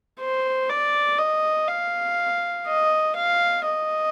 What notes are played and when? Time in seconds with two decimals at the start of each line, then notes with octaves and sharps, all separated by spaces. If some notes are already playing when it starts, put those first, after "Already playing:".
0.20 C5
0.69 D5
1.18 D#5
1.68 F5
2.67 D#5
3.16 F5
3.65 D#5